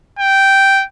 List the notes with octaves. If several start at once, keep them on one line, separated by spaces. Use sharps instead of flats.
G5